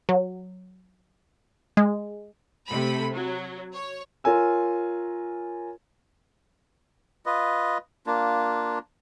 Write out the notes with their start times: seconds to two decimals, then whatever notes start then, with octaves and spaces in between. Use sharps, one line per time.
0.09 F#3
1.77 G#3
2.69 C3 A3 B5
3.12 F#3
3.73 C#5
4.24 F4 A#4 C#5 G#5 E6
7.26 F4 B4 D#5
8.07 A#3 D4 F4